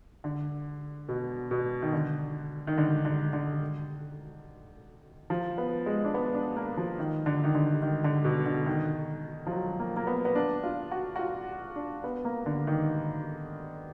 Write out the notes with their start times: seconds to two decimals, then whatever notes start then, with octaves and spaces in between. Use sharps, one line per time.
0.24 D3
1.09 B2
1.51 B2
1.82 D#3
1.93 D3
2.67 D#3
2.78 D3
3.05 D3
3.33 D3
5.30 F3
5.58 B3
5.86 G#3
6.05 D4
6.14 B3
6.35 D4
6.57 A#3
6.77 F3
6.99 D#3
7.26 D3
7.44 D#3
7.54 D3
7.82 D#3
8.04 D3
8.25 B2
8.46 D3
8.66 D#3
9.47 F3
9.52 F#3
9.80 A#3
9.96 A#3
10.07 B3
10.25 B3
10.35 D4
10.64 F4
10.91 F#4
11.16 F#4
11.19 F4
11.76 D4
12.04 B3
12.25 A#3
12.46 D3
12.67 D#3